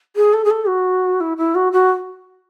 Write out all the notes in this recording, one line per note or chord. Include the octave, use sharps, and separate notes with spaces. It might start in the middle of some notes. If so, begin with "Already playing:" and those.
G#4
A4
G#4
A4
F#4
E4
E4
F#4
F#4